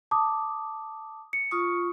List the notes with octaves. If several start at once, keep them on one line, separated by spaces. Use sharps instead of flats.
A5 D6 D#6
C#7
F4 C#6 D#6